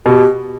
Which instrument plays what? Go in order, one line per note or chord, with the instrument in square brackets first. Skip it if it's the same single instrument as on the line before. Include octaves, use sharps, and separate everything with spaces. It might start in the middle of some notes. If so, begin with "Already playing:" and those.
[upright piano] B2 [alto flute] G4